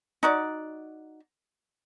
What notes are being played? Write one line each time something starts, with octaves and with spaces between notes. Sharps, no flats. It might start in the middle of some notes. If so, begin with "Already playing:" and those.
D#4 F#4 D5